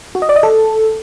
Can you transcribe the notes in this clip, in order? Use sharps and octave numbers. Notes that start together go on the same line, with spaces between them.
F#4
D#5
D5
D#5
A4